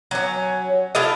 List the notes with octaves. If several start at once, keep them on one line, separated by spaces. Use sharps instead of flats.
F#3 C#4
E4 F4 A4 D#5